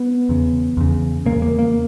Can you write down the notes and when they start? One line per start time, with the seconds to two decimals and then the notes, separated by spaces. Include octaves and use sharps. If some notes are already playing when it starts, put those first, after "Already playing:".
Already playing: B3
0.29 E2 C#3
0.77 E2 C#3
1.26 E2 C#3 A#3
1.42 A#3
1.59 A#3